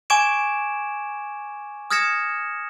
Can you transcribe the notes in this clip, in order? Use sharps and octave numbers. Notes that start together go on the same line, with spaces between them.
G#5 C#6 D6 G#6 D7 E7
D#6 F6 G#6 A#6 C#7 E7